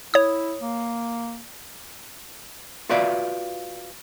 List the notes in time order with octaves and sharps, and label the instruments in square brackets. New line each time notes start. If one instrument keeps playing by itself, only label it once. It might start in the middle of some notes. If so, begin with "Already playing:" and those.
[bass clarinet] E4 [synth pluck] C#5 D#6
[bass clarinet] A#3
[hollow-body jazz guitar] F4 F#4 B4 D5 E5 F5